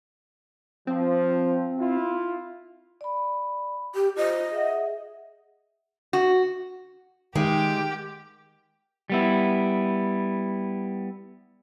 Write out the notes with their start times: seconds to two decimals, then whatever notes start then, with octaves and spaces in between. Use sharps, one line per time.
0.87 F3 C4
1.79 E4 F4
3.01 D5 B5
3.95 G4
4.16 F4 C5 D#5
4.52 G#4 E5 F#5
6.13 F#4
7.35 D#3 G#3 G4 A#4 G5
9.10 G3 B3 E4